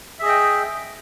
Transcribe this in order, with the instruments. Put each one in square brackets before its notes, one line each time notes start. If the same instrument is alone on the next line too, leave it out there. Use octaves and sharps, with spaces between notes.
[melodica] E5
G#4
D#5
G5